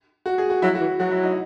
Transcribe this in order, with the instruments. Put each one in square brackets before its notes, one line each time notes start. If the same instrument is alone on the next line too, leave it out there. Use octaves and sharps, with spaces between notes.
[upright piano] F#4
G#4
F#4
[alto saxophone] F#3 [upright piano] E4
[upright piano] F#4
[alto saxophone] E3
[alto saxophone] F#3 [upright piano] F#4
[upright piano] E4
D#4